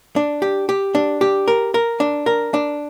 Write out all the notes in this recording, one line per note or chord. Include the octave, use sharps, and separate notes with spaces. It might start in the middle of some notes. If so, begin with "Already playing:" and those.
D4
G4
G4
D4
G4
A#4
A#4
D4
A#4
D4